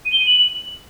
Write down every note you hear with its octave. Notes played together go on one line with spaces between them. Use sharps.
D#7
G7
D#7
F#7